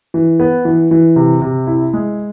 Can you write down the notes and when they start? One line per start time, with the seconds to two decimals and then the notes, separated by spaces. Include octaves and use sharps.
0.14 E3
0.40 B3
0.65 E3
0.91 E3
1.16 C3
1.42 C3
1.67 E4
1.93 G#3